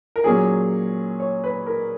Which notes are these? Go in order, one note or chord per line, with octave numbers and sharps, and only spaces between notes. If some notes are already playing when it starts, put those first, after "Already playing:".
A#4
A#2 F#3 A#3 C#4 G#4
C#5
B4
A#4